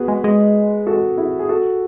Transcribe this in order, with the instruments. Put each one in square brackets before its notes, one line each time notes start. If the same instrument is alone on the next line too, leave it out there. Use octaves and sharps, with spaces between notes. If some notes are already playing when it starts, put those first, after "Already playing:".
Already playing: [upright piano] B3 F#4 G#4 B4
[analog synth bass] G#3
G#3
[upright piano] F#4 A4
E4 G#4
G#4
F#4 A4